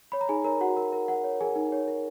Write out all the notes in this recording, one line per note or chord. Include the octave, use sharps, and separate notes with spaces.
C#5 B5
A#5
D#4 G#4 G#5
A#4 C#5 A#5
F#4 F#5
A#4
A#4
A#4 F#5
C#5
G#4 A#4 G#5
D#4
C#5
A#4